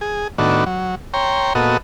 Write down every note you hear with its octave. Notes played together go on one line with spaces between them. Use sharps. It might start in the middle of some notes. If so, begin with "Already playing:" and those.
G#4
A2 D#3 B3 D4 F#4
F#3
C#5 G5 A#5 C6
A#2 B3 F#4 A4 D#5